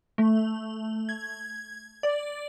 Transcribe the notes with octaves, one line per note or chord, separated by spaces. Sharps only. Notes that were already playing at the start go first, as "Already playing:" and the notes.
A3
G#6
D5